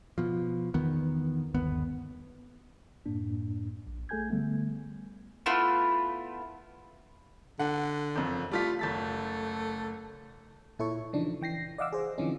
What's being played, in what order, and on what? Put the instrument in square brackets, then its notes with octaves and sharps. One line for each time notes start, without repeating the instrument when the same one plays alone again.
[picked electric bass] B2 F3
E2 D#3 B3
G1 D#2 B3
[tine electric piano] F#2 A2 A#3 D4
A#1
A3 G#4 A4 G#5 G6 G#6
D3 G3 A3 B3
[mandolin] A3 B3 E4 F4
[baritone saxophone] D3 [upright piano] F#5
[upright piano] F#1 F2
[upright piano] G3 F4 B6 [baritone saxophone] A3
[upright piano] F#1 A6 B6 [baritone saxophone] A3
[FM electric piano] A#2 E4 A4 C#5 C#6
C#3 E3 F3 D4 D#4
E3 G5 A#6 C7
D5 D#5 F5 F#5 D6 E6
G#4 C5
D3 E3 F3 C4 C#4 D#4